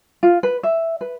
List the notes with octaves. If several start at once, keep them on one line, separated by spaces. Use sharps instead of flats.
F4
B4
E5
B4